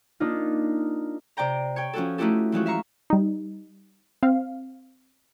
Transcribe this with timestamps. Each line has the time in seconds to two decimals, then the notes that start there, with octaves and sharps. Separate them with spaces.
0.20 A#3 D4 D#4 F4
1.37 C3 C5 D5 G5 A#5
1.76 C#5 G5
1.93 F3 C#4 F#4 A4
2.18 A3 D#4 E4 F#4 G4 A4
2.52 E3 F3 G#3 F#4
2.66 E5 F5 A#5 C#6
3.10 G3 D#4
4.23 C4 F5